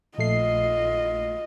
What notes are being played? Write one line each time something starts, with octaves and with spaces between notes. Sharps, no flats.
A#1 A3 F4 D#5 C7